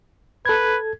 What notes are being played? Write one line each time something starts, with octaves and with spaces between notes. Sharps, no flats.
A4 B4 G#6